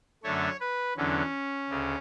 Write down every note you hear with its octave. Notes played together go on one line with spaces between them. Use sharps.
F#2 D3 A3 C#5
B4
E2 D3 F#3 C#4
D2 C#3